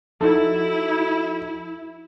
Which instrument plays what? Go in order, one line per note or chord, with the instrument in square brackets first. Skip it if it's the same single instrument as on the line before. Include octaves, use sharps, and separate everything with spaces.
[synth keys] F3 D#4 F#4 [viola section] E4 [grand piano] A4